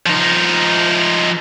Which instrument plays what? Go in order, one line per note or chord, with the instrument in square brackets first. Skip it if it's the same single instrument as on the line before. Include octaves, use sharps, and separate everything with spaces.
[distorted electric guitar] F3 D#4